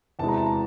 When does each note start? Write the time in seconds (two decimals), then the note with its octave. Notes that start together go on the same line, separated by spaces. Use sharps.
0.19 E2 C3 E3 G#3 A5
0.29 A#5
0.37 A5
0.46 A#5